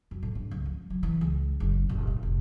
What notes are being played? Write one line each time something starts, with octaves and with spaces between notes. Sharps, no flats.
F#2
A2
G2
C#2
F3
F#3
E3
C#2
F#1
D#1
G#2
F1